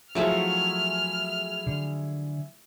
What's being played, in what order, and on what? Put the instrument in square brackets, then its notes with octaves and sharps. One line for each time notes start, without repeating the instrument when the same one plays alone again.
[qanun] F3 F#3 A3 [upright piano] E4 G#4 E5 [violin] F6
[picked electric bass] D3